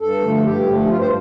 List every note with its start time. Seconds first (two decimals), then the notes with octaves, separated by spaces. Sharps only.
0.01 G2 A4
0.23 D3 F3 A3
0.45 G2 G4
0.67 D3 F3 A3
0.88 G2 F4
1.00 C5